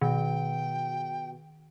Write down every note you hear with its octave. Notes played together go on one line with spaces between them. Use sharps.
B2 D#3 G5